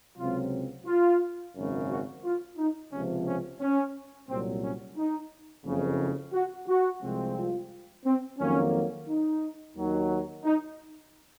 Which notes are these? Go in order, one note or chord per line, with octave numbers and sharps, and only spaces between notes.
C#2 C3 F#3 C4 F4
F4
G#1 F#2 C#3
F#4
F4
D#4
C#2 C3 F3 C#4
C#4
C#4
C2 A#2 F#3 C4
C#4
D#4
F#1 F2 C#3
F#4
F#4
C2 C3 F3 G#3 C4
F4
C4
F2 D#3 F#3 A#3 C#4
D#4
D#2 D#3 F#3
D#4